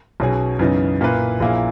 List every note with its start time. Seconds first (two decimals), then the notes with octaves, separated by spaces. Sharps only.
0.20 B1 B2 F#3 C#4 G#4
0.59 F#2 C#3 E3 B3 D#4
1.01 A#2 A#3 E4 B4
1.40 A#1 A#2 A#3 E4 G#4